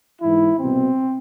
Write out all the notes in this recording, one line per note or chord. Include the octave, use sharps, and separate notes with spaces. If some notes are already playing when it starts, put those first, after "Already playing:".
G#2 E3 E4
C2 B2 C4